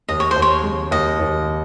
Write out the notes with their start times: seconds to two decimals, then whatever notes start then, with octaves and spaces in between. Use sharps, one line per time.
0.09 D#2 D#5
0.20 C#5
0.31 C5
0.36 D#2
0.42 C#5
0.64 G#3
0.91 D#2 D#5
1.19 D#2